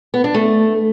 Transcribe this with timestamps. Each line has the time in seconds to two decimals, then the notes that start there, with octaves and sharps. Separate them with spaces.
0.14 B3
0.24 D4
0.34 A3